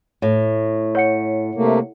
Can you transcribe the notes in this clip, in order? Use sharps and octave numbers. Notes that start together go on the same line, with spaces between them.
A2
C#5 F#5 C#7
C3 A3 A#3